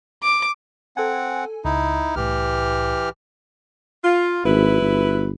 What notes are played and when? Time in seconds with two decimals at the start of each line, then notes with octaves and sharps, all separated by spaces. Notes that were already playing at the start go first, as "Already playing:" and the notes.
0.23 D6
0.97 C4 A4 F#5 G#5
1.65 C#2 D#4 E4
2.16 C2 A2 E3 G4 F6
4.04 F4
4.45 G#1 F#3 E4 B4
4.81 G1